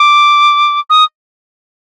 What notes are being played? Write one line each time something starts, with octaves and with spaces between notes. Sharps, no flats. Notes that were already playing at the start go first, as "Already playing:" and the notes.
Already playing: D6
D#6